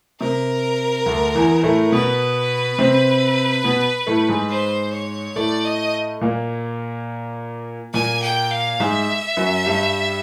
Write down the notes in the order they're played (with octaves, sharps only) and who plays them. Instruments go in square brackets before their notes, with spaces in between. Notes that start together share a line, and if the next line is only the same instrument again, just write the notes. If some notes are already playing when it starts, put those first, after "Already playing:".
[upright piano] C3 [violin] A#4
[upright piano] D2 D3
E2 E3
A2 A3
[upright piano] B2 B3 [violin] B4
[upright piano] C3 C4
B2 B3
A2 A3
G#2 G#3
[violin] C5
C#5
[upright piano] A2 A3 [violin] D5
[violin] D#5
[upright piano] A#2 A#3
[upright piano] A#2 A#3 [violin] G#5
[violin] G5
F5
[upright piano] G#2 G#3 [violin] E5
[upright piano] F#2 F#3
G2 G3